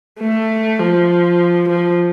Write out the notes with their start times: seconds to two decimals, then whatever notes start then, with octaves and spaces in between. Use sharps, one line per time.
0.19 A3
0.79 F3
1.69 F3